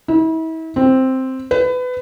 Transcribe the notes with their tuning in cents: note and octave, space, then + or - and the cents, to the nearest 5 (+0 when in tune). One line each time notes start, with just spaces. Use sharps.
E4 -40
C4 +0
B4 +25